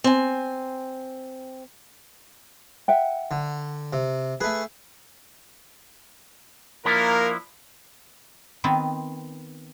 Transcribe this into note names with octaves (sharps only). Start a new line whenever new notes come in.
C4 G#5
E5 F#5 G5
D3
C3
A3 G#4 B4
F3 A#3 D4 E4 A#4
D#3 B3 C4